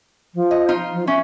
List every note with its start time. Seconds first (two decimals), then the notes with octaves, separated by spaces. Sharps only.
0.35 F3
0.51 D#5
0.69 D#4 F4
0.93 F3
1.07 C#4 E5